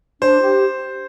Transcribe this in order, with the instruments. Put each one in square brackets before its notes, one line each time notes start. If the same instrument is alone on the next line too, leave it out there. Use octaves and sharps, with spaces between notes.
[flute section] D4 [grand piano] C5
[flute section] G4